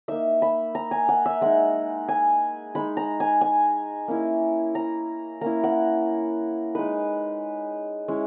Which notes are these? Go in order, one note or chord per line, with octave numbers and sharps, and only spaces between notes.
A#3 D#4 E5
B5
A#5
G#5
F#5
E5
G#3 D#4 F#5
G#5
G#3 D#4 B5
A#5
G#5
G#5
A#3 C#4 E4
A#5
A#3 C#4 E4 A#5
F#5
G#3 D#4 B4
G#3 C#4 E4